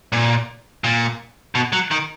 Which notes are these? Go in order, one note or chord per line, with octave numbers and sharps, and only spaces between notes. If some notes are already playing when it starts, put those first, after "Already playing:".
A#2
A#2
B2
F#3
D#3